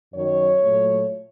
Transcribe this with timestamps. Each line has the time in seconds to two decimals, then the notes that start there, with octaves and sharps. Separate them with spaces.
0.14 F#2 D#3 F#3 C#5
0.63 A#2 F#3 A3